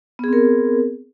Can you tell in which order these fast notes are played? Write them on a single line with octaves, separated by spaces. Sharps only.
B3 G#4 C4 A#4